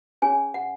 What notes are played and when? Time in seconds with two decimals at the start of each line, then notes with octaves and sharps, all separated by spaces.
0.22 C#4 G#4 C#5 G#5
0.54 F#5